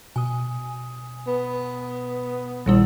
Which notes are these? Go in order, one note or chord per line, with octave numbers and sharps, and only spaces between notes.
B2 G#5 D#6
B3
A#1 A#2 D#3 G3 E4 E6